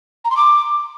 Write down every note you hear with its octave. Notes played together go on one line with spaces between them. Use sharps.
A#5
C6
D6